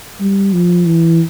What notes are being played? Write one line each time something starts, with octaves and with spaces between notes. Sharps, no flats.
G3
F3
E3